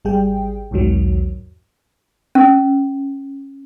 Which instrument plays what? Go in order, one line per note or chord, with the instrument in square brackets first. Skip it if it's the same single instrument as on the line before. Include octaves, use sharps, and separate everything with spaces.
[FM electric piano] G#1 G3 G#4 G5
B1 E2 G#2 D#3 F#3
[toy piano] C#4